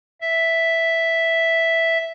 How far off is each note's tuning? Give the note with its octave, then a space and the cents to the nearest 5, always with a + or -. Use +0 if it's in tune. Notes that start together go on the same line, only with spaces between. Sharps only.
E5 +0